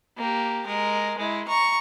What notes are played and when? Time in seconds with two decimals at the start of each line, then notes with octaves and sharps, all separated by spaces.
0.17 A#3 G4
0.66 G#3 A#4
1.18 G#3 E4
1.48 A#5 C#6